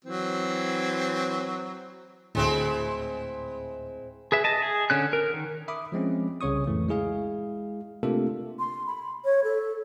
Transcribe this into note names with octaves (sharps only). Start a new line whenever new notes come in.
E3 F#3 C4
D2 A2 G#3 C4 E4
G#4 B4 E5
D#5 A5
G#4
D3 C#4 F#6
A#4
D#3
E5 B5 D6 D#6
F3 G#3 C4 C#4
C2 C#3 C#5 C#6 D#6
F2 A2 E3 A3
G#3 E4 G#4 F5
C3 A3 A#3 D4 F4 A4
C6
B5
C#5
A4